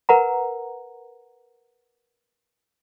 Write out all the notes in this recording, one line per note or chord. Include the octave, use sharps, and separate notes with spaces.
A#4 B4 F#5 A#5